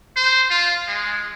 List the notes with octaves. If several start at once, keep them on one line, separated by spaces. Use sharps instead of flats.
C5
F4
G#3